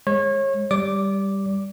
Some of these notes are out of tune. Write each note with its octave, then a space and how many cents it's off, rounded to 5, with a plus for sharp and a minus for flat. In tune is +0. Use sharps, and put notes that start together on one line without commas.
G#3 -15 C#5 -30
G3 +5 D5 -30 D6 +0